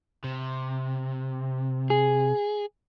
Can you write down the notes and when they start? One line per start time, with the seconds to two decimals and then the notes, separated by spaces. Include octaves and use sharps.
0.24 C3
1.90 G#4